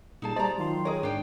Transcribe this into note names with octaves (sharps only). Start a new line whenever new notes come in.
A#2 G3 D#4 G#4 A5
G3 C5 D5 D#5 A5 A#5
D#3 F#3 F4 C6
G#4 A#4 C#5 D#5 D#6
G#2 D4 G5